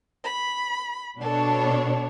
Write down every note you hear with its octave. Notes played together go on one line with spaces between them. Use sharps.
B5
B2 D4 A4 C#5